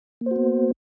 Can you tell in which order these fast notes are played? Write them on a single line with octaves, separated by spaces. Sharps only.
A#3 C5 F#4 B3